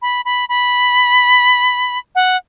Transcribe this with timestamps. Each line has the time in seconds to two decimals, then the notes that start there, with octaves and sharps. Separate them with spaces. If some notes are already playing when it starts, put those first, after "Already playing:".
0.02 B5
0.25 B5
0.49 B5
2.15 F#5